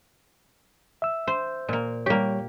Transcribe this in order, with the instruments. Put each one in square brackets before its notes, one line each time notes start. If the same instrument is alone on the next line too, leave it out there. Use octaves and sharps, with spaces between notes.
[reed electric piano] E5 E6
[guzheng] C5
A#2 A#3
[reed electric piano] G3 C#5 [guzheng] A#3 G4